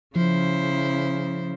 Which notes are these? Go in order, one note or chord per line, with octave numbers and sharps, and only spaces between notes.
C#3 F3 E4 C5